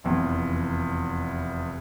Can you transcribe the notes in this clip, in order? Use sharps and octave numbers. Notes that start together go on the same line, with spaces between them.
F1 E2